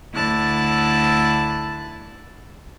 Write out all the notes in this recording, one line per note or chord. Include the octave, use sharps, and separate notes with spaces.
D2 D3 E4 A5 F#6 A6